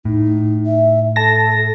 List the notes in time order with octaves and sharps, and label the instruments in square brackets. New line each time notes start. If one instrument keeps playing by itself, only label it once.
[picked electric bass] A2 [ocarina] D#4
[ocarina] E5
[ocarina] A4 [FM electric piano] A5 A#6